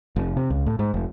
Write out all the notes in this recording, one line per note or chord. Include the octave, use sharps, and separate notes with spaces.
F1
C3
C#2
A2
G#2
F1